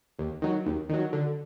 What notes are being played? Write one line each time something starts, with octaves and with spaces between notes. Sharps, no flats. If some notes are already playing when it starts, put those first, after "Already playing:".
D#2
D#3 F#3
D#2
D#3 F#3
D3